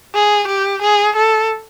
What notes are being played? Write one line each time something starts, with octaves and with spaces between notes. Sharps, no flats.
G#4
G4
G#4
A4